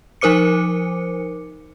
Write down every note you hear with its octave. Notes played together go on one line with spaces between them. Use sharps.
F3 D#4 A#4 C5 D6 C#7